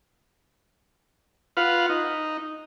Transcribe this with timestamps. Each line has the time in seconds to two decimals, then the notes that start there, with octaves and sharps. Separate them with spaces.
1.57 F4 B4 F5 F#5
1.90 D#4